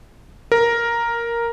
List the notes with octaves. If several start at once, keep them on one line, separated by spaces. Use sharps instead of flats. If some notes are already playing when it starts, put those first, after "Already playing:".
A#4